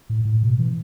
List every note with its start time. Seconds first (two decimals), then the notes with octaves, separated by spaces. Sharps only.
0.10 A2
0.25 A2
0.43 B2
0.59 E3